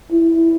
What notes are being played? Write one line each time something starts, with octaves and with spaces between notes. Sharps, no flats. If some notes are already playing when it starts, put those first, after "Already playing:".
E4